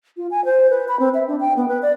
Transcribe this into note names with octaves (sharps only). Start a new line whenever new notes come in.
F4
G#5
C5
B4
B5
C4
E5
D4
G5
B3
B4
D5